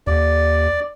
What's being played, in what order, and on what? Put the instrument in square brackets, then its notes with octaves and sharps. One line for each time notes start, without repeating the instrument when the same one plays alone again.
[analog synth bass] D#2 [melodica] D5